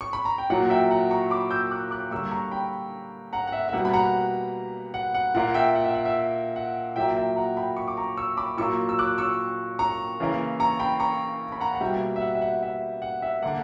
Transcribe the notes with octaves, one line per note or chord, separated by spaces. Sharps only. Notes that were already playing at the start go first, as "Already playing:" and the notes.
C#6
B5
A#5
G5
A#2 F#3 A#3 F#5
E5 G5
F#5 A#5
A#5 C#6
B5 D6
E6 G6
D6 F#6
D6 F#6
D3 G3 A#3 C#6 E6
A#5 C#6
G5 B5
F#5 A#5
F#5
E5
E5
B2 G3 A#3 F#5
B5
F#5 A#5
F#5
F#5
A#2 A#3 F#5
E5 G5
F#5
E5
F#5
E5
F#5
A#2 F#3 A#3 E5 G5
E5 G5
F#5 A#5
G5 B5
C#6
D6
A#5 C#6
C#6 E6
B5 D6
A#2 F#3 A#3 C#6 E6
E6
D6 F#6
C#6 E6
A#5 C#6
C#3 E3 A#3
A#5 C#6
G5 B5
A#5 C#6
B5
F#5 A#5
F#5
B2 G3 A#3 E5 G5
E5
F#5
E5
F#5
E5
F#5
E5
D3 A#3 F#5